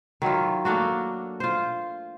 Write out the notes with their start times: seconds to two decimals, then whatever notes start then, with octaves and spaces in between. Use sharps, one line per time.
0.22 D#3 F#3 E4 F4
0.65 A3 A#3 D4 F#4
1.40 F4 C5